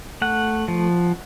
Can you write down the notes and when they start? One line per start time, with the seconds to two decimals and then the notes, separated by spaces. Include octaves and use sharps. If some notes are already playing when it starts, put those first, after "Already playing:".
0.22 A3 F#5
0.68 F3